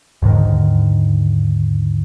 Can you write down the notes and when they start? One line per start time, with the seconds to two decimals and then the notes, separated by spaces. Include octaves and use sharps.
0.22 D#2 G#2 D3 D#3